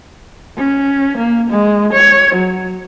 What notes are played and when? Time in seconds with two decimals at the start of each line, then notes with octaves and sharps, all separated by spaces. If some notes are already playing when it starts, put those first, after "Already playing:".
0.58 C#4
1.18 A#3
1.50 G#3
1.94 C#5
2.35 F#3